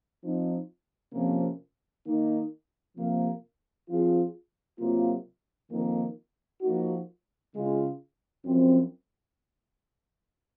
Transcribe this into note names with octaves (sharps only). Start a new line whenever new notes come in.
F3 C4 D#4
F2 C3 F3 A#3 C#4
D#3 A#3 D#4
C3 F3 A#3
F3 C4 F4 G#4
C3 F#3 A#3 F4
F2 D#3 A#3
F3 A#3 D#4 F#4
C#3 G#3 C#4 F4
F#2 F3 C4